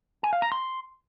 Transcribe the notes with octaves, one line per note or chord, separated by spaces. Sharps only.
G#5
F5
A#5
C6